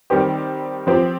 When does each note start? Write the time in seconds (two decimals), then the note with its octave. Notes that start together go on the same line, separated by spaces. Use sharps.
0.10 D#3 G3 C4 G4
0.87 F3 C4 G4